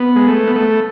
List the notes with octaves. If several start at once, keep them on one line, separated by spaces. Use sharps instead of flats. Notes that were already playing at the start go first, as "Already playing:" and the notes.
Already playing: B3
G#3
A3
B3
A3